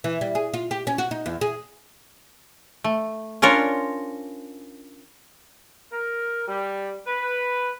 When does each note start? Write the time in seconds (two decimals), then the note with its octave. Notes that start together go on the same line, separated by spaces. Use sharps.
0.04 E3
0.21 G3
0.35 G#4
0.54 F4
0.71 G4
0.87 C#4
0.98 F#4
1.11 D#4
1.26 E2
1.41 G#4
2.84 A3
3.42 C#4 D4 F4 A#4 C5 C#5
5.92 A#4
6.47 G3
7.07 B4